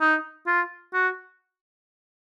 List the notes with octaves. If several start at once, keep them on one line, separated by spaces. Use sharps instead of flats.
D#4
F4
F#4